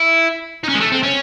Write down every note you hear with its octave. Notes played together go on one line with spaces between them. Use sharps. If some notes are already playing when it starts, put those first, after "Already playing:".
Already playing: E4
D#4
C#4
G#3
A3
C4
C#4